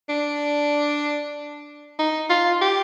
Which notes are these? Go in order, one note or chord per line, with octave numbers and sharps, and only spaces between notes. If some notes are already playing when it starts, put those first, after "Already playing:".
D4
D#4
F4
G4